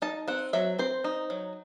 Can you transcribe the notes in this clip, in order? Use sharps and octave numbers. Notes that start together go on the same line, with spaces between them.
D#4 A5
C4 F#5
F#3 E5
C4 C5
D#4
F#3